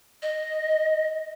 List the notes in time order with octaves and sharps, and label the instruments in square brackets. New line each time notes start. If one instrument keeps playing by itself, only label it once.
[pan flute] D#5